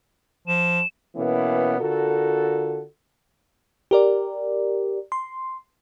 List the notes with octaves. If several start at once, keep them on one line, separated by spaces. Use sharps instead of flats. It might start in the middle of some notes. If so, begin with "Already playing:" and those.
F3 E7
B2 E3 A#3 B3 C#4
D3 F4 F#4 A4 A#4
G4 A#4 D5
C6